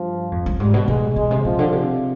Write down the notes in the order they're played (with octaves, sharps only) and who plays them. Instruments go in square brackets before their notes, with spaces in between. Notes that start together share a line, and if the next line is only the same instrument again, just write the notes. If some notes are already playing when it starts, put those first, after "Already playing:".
Already playing: [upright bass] G2 [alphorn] F3
[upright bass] F2
G2
[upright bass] G#2 [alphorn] G3
[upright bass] B2
[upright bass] B2 [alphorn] G#3
[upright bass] B2 [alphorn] G#3
[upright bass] C3
[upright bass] B2 [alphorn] F3
[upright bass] D3
C3